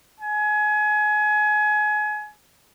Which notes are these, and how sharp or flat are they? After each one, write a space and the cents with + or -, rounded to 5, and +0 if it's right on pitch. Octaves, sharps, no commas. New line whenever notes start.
G#5 +25